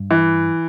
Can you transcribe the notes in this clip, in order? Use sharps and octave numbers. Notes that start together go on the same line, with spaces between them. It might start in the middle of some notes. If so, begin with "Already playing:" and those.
Already playing: G2
E3